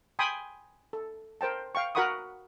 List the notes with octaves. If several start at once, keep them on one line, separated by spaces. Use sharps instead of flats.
G5 G#5 B5 C6 D#6
A4
A#4 C5 G5 A5
F5 G5 C#6
F#4 A#4 F#5 B5 C#6 D#6